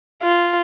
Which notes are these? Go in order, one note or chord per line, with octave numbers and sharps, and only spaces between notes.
F4